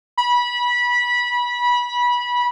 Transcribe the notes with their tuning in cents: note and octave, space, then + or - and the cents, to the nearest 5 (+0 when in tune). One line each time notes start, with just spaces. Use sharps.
B5 -20